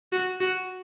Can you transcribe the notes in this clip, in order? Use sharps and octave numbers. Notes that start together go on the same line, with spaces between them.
F#4
F#4